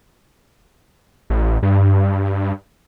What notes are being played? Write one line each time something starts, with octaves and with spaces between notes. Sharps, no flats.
A1
G2